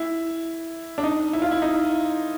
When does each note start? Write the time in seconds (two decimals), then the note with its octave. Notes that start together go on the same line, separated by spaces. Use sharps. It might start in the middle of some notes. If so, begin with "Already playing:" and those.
Already playing: E4
0.98 D4
1.03 D#4
1.33 E4
1.42 F4
1.51 E4
1.62 D#4